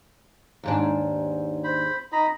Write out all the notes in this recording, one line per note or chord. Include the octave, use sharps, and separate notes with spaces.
D#2 G#2 D4
C5 B5
D#4 A#5 B5